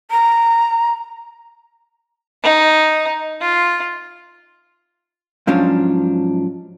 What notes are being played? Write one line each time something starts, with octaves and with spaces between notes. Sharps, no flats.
A#5
D#4
F4
G#2 F3 F#3 C#4 D4